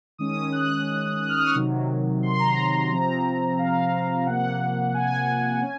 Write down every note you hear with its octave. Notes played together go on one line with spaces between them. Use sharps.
D#3 G#3 C#4 D#6
F#6
F#6
F6
D#6
C#6
C3 D#3 F#3
C6
A#5
C3 F3 C4 A#5
F5
C3 F3 A#3 F#5
G#5
C#4